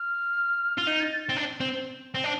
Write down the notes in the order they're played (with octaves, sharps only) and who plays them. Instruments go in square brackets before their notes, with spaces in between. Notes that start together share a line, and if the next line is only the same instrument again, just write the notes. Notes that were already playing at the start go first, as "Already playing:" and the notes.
Already playing: [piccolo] F6
[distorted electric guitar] F4
[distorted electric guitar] D#4 [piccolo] G6
[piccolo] A6
A6
A6
[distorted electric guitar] C4
D4
C4
C4
D4